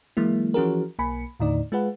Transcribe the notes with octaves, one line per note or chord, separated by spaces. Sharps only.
E3 F#3 G#3 A#3 E4
E3 F3 C#4 F#4 G#4 A#4
B1 A#3 G#5 B5 C#7
D#2 A2 D3 D#4 D5
G#3 F4 G#4 B4 F#5